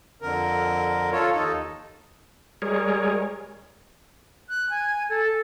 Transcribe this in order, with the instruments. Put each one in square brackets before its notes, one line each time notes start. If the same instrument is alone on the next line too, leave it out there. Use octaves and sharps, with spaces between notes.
[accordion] F2 D3 A#4
F4 A4 C#5
D#2 D#4 A4
[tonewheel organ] G3 G#3 G#4 A#4 C#5
[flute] F#6
G#5
A4